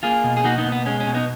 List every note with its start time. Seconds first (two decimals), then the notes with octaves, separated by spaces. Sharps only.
0.03 A#3 F4 G#4
0.24 B2
0.37 G#4
0.44 A#3 D#4 F#4
0.58 B3 D#4
0.65 B2
0.72 B3
0.86 G#3 C#4
1.00 C#4
1.07 B2
1.15 B3 D#4